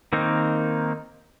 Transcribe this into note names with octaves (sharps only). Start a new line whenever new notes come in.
D#3 A#3 C4 D#4